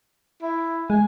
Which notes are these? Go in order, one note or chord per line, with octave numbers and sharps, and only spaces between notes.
E4
G#3 G#5